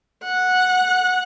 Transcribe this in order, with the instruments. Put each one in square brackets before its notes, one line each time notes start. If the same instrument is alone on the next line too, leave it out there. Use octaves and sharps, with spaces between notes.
[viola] F#5